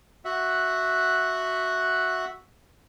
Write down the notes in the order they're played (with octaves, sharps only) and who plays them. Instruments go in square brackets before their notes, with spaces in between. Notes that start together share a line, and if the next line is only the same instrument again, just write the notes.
[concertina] F#4 E5 F#5